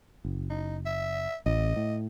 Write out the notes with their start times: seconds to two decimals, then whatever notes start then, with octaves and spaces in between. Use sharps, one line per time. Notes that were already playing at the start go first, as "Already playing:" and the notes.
0.25 F#1
0.50 D#4
0.86 E5
1.46 A1 D#5
1.76 A2